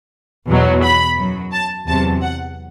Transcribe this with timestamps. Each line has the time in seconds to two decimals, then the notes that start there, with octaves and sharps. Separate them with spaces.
0.48 E2 B2 F#3
0.83 B5
1.17 F#2 F#3
1.52 A5
1.87 E2 C3 F#3 A5
2.22 F#5